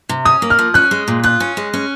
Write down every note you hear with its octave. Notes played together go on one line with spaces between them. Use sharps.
C3
C#4 D#6
A#3
F6
F3
C#4 F#6
G#3
A#2
F4 F#6
C#4
G#3
C#4